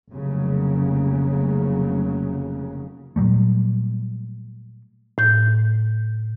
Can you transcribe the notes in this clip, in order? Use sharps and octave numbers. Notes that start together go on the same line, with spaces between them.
F1 C#3 F#3 A#3
A#2 F#3 G3 A3
A2 G6